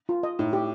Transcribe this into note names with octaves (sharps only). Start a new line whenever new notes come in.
F4
D#5
A2 D#4
G4